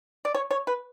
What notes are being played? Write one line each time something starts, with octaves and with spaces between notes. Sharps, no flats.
D5
C#5
C#5
B4